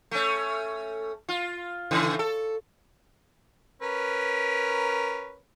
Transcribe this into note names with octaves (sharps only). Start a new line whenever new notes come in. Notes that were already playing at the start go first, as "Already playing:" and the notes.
A3 C#4
F4
A2 C#3 E3
A4
C#4 A#4 B4